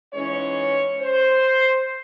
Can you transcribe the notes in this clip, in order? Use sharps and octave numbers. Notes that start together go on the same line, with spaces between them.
G#2 E3 G#3 C#4 C#5
C5